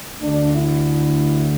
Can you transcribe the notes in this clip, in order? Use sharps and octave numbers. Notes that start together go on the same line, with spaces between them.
D2 D3 A3 D4
E4